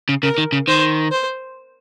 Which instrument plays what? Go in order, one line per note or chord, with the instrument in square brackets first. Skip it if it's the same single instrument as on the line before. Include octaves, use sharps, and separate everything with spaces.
[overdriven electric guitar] C#3
[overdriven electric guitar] C#3 [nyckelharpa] A#4
[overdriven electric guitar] D#3
C#3
[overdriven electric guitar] D#3 [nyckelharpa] C5
[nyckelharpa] C5